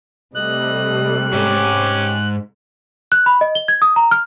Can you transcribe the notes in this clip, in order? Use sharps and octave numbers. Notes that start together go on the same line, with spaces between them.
C3 G3 A3 D#5 F#6
G#2 C#4 G4 D6
F#6
B5
D#5
G7
G#6
D#6
A#5
F6